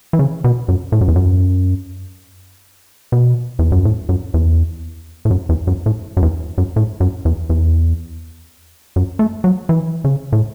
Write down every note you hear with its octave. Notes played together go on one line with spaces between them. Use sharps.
E3
C#3
B2
F#2
A2
F#2
E2
F#2
B2
E2
F#2
A2
F#2
E2
A2
F#2
E2
F#2
A2
F#2
E2
F#2
A2
F#2
E2
E2
F#2
A3
F#3
E3
C#3
A2